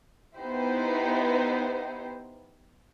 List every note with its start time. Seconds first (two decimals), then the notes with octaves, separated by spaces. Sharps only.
0.37 B3 D#4 E4 G4 C5